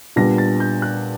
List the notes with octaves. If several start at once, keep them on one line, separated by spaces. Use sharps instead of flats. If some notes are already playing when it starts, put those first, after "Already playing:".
A#2 G3 B3 D4 A#6
A6
G6
F#6